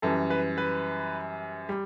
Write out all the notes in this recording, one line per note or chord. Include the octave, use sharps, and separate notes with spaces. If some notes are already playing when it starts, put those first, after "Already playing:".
F#2 E3 G3 A4
B4
B4
G3